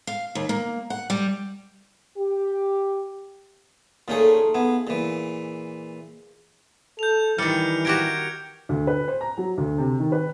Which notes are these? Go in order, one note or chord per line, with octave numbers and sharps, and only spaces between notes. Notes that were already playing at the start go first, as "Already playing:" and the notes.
F5
D#2
A#3
F#5
G3
G4
A#2 A3 C#4 D#4 F4 G#4
B3 G#4 E5
A#2 E3
A4 G6 F7
D#3 E3 G3 F6 C#7
F#4 G4 A#4 G#6 D7
D2
B4
C5
A#5
F#3
D2
C3
D#3
B4